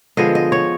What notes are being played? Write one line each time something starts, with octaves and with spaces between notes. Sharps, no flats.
D3 F3 G#3 B3 D#5
D#5
C#5